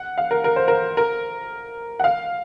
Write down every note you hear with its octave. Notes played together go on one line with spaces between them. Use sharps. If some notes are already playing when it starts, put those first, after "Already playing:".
Already playing: F#5
F5
A#4
A#4
C5
A#4
A#4
F#5
F5